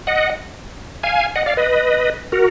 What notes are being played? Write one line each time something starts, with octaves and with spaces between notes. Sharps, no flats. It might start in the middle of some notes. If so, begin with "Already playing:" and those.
D#5 F#5
F5 G#5
D#5 F#5
D5 F5
B4 D#5
F#4 A#4